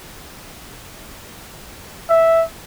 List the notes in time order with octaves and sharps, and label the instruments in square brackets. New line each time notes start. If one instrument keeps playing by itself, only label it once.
[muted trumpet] E5